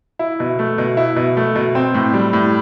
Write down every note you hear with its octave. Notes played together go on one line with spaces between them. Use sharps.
E4
B2
A3
B2
E4
B2
A3
B2
C4
A2
G3
A2